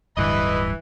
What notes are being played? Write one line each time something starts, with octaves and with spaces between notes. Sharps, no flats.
D1 G2 D3 E3 B4 D#5